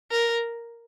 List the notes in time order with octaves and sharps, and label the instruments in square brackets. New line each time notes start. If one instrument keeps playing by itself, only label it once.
[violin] A#4